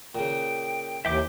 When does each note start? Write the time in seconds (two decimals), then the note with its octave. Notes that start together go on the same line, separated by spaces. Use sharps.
0.15 A#2 C#3 G5
1.05 D#2 E3 E5 G5 D6